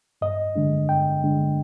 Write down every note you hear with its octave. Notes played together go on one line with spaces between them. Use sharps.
G2 D#5
D3 G#3 D4
G2 G5
D3 G#3 D4